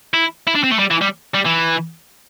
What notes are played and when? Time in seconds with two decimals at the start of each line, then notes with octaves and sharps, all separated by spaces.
0.14 E4
0.47 E4
0.55 D4
0.64 C4
0.71 A3
0.79 G3
0.91 E3
1.02 G3
1.35 G3
1.46 E3